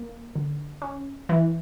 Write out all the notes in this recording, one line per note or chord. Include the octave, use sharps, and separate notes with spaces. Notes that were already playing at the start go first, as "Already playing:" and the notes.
Already playing: A#3
D3
C#4
E3